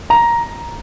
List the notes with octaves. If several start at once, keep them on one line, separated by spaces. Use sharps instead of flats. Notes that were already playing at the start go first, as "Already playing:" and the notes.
A#5